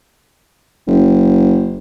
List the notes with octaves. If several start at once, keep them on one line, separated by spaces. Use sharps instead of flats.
F#1